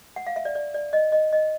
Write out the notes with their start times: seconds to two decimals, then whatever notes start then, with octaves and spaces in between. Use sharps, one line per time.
0.16 F#5
0.27 F5
0.36 E5
0.45 D5
0.55 D5
0.74 D5
0.93 D#5
1.12 D#5
1.33 D#5